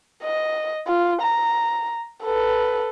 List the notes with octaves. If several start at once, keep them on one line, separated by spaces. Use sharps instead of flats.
D#5
F4
A#5
A4 B4